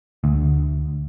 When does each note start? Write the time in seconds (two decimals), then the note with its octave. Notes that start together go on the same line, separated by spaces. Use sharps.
0.24 D2